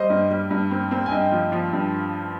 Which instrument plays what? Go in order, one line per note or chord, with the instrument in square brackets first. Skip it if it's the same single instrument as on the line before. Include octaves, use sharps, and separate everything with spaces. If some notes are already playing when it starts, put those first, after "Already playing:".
Already playing: [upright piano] G3 [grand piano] C5 D#5
[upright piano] G2
G3
G2
C4
C4
[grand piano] G#5
[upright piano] G2 [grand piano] D#5 G5
[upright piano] F3
F3
G2